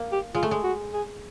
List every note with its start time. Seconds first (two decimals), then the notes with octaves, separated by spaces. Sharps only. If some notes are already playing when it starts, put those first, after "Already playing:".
Already playing: A#3
0.12 G4
0.35 G#3 F4
0.43 A3
0.51 G#3
0.63 F#4
0.93 G#4